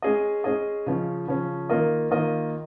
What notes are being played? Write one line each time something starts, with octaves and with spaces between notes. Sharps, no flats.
G#3 C#4 G#4 D#5
G#3 C#4 G#4 D#5
C#3 F3 C#4
C#3 F3 C#4
D#3 A#3 F4 A#4 D#5
D#3 A#3 F4 A#4 D#5